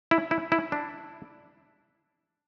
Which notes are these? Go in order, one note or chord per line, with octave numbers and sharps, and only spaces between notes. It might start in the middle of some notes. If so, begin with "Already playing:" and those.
E4
E4
E4
D4